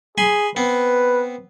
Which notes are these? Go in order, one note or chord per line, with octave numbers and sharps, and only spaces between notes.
G#4 G#5 B5 C6
B3 C4 B4